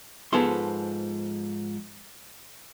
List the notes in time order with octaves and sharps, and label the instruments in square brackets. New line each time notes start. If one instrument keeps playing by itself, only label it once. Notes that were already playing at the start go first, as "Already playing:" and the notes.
[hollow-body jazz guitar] G#2 F3 B3 G#4 A4 C6